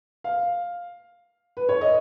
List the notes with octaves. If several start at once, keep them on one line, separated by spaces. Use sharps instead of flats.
F5
B4
C#5
D#5